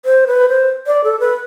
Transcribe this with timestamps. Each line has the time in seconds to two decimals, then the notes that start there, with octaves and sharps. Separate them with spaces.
0.05 C5
0.27 B4
0.49 C5
0.87 D5
1.04 A4
1.20 B4